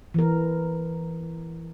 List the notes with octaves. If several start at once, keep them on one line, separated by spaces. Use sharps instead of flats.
E3 A#4